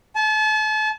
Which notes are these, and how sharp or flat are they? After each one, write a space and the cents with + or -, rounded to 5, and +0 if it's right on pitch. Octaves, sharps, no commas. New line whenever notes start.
A5 -35